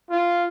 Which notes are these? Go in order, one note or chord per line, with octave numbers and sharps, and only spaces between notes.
F4